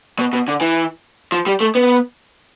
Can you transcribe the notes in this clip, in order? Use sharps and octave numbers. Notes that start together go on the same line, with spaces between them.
B2
B2
D3
E3
F3
G3
A3
B3